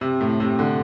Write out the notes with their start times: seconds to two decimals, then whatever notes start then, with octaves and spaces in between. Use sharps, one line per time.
0.01 C3
0.21 A2
0.40 C3
0.59 D3